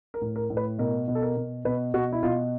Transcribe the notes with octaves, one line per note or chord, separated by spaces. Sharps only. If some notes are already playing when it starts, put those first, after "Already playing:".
A#4
A2
A#4
A2
B4
B2 A#4
B2
A4
A#4
B2
B2 B4
B2 F#4
E4
B2 F4